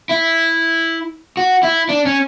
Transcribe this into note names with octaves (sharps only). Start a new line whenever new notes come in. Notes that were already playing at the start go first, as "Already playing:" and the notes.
E4
F#4
E4
D4
C#4